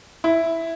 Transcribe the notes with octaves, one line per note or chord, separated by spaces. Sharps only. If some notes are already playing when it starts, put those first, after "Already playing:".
E4